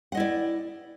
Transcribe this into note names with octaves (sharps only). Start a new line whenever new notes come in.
E4 D5 D#5 F#5